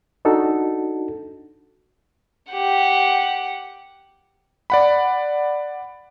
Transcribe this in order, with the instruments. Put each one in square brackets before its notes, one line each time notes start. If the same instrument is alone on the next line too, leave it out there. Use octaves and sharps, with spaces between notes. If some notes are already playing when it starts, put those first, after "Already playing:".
[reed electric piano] D4 D#4 F#4 A4
[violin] G4 F#5
[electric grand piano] D5 F#5 B5